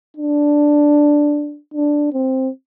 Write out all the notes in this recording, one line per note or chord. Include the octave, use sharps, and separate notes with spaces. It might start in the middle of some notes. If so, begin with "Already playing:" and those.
D4
D4
C4